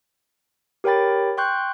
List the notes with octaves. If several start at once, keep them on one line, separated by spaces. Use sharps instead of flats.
G4 A#4 C#5 G5 B5 A6
G5 C6 C#6 F#6 G6